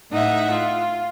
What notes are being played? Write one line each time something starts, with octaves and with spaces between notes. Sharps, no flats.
A2 D#4 E5 F#5
F4